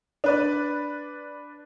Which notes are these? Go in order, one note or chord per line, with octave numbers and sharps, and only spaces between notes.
D4 B4 D5